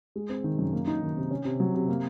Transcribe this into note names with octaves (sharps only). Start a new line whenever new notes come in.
G#3
C4
D#3
F#2
A#3
D#4
D#3
C3
C#4
C3
F#3
C3
A#3